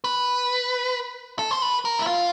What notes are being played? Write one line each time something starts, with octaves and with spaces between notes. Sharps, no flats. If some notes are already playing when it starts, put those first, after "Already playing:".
B4
A4
C5
B4
A#4
E4
F4